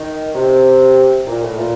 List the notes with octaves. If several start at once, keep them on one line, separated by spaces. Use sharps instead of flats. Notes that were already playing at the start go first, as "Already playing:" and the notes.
Already playing: D#3
C3
A#2
A2
A#2